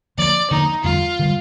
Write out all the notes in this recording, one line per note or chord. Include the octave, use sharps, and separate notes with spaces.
D3 F3 A#3 D5
D3 F3 A#3 D#4
F2 D3 G3 F4
D3 G3